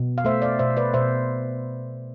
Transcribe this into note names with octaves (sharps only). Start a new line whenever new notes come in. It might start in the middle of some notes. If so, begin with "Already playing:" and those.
Already playing: B2
F5
A3 C5 E5
D5 F5
B2 C5 E5
B4 D5
B2 C5 E5